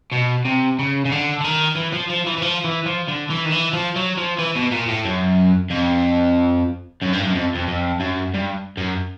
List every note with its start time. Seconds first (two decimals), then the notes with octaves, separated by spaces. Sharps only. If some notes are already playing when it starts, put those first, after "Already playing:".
0.12 B2
0.45 C3
0.79 C#3
1.05 C#3
1.12 D3
1.41 D3
1.44 D#3
1.76 E3
1.93 F3
2.10 F3
2.27 E3
2.38 E3
2.42 F3
2.64 E3
2.86 F3
3.08 D3
3.30 E3
3.45 D#3
3.52 E3
3.73 F3
3.96 F#3
4.18 F3
4.39 E3
4.56 B2
4.72 A#2
4.88 A2
5.05 F#2
5.71 F2
7.02 F#2
7.13 G2
7.23 F#2
7.35 F2
7.55 F2
7.68 F2
8.00 F#2
8.34 G2
8.77 F#2